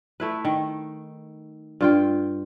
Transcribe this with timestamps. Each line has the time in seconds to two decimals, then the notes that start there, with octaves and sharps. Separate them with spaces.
0.20 A3 E4 B4
0.45 D#3
1.81 G2 F4 G5